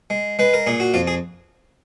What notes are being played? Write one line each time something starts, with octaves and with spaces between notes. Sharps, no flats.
G#3
G#3 B4
A#4
A#2 G#4
F#4
F2 F4
G#4